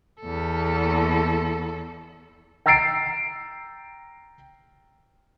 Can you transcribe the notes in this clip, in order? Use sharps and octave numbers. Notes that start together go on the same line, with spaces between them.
E2 A4
G5 A#5 E6 A6 C7 D7